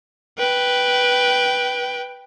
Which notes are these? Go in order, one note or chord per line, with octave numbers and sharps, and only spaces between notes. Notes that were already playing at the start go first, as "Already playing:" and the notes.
B4 G5